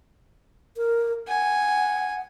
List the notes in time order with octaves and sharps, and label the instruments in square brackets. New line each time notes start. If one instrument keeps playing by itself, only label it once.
[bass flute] A#4
[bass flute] F#5 [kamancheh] G#5